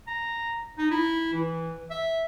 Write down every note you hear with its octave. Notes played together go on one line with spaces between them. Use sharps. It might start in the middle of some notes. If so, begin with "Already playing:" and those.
A#5
D#4
E4
E3
E5